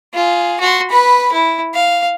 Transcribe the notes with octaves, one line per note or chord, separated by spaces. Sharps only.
F4 G#4
F#4 C6
B4 B5
E4
F5